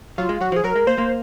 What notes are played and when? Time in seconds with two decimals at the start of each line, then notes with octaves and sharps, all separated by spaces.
0.18 F#3 F4
0.29 G#3
0.41 F#3 F#4
0.52 F3
0.56 G#4
0.64 F#3 A#4
0.76 G#3
0.87 A#3 C5
0.98 A#3